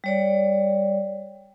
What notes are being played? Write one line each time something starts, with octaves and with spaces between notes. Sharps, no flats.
G3 C#5 D5